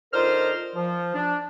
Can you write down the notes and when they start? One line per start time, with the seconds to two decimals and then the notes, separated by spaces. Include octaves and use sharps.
0.13 D3 D#4 F4 A#4 C5 F6
0.75 F3
1.15 D4